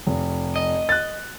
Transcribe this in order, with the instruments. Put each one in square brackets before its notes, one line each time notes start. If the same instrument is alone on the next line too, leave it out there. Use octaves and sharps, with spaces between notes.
[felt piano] F1
[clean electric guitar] D#5
[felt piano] F#6 A6